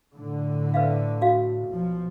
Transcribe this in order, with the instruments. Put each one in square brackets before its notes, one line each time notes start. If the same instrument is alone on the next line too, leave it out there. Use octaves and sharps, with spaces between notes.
[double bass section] A2 D3
[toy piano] B4 E5 F5
F#4 F5
[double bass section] B1 F3